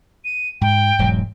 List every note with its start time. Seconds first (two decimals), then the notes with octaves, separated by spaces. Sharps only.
0.24 D#7
0.61 G#2 G5
0.99 E1 G#2 F#3